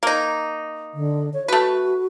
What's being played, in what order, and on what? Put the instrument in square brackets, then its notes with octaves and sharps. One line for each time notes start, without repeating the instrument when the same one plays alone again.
[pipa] A#3 D#4
[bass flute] D3
C#5
[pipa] A3 B4 [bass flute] F#4